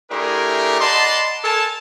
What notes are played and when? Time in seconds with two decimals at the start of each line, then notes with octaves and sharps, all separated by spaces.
0.11 A3 D4 E4 G4 G#4 A#4
0.81 D5 D#5 F#5 A5 B5 C6
1.44 A4 A#4 G#5 A5